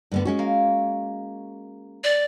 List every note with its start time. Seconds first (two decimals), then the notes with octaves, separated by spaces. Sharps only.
0.12 G2 D3 B3
0.25 G#3 C#4 F#4
0.39 A#3
2.04 D5